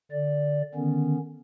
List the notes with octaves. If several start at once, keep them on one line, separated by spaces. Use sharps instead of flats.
D3 D5
D3 D#3 B3 C#4